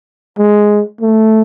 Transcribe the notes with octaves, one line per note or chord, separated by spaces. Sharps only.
G#3
A3